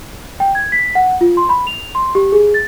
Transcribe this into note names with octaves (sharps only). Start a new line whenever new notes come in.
G5
G#6
B6
F#5
F4
C6
B5
F7
C6
G4
G#4
A6